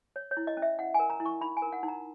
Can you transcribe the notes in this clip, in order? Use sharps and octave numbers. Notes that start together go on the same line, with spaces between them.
C#5
C#5
E4
D#5
C#4
E5
E4 F#5
A#4 G#5
A#5
E4
C#6
D#4 B5
G#5
A#4
F#5
D#4
A#5